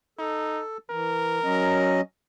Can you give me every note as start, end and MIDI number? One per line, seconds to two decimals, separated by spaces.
0.19 0.63 63
0.19 0.77 69
0.91 1.40 52
0.91 2.00 70
1.44 2.01 54
1.44 2.01 61
1.44 2.01 75